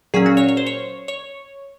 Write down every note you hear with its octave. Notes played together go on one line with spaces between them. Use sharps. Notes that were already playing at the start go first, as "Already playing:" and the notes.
A#2 F#3 C#4 G#4
F#4
C#5
C#5
C5
C#5
C#5